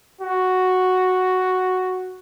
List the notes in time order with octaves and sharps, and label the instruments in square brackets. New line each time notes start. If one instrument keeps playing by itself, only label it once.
[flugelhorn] F#4